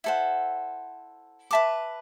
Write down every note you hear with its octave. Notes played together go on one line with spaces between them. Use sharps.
E4 A4 C5 F#5
B4 E5 A5 D6